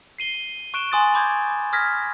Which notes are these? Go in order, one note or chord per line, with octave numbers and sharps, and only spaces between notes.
C7 D#7 G7
C#6 F#6 D7 E7 G7
G#5 C6 D#6 F#6 A6
B5 D6 G6 G#6
D#6 F6 G#6 A#6 B6